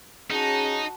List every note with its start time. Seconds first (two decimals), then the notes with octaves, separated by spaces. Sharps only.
0.31 C#4 D#4 F#4 G#4 A5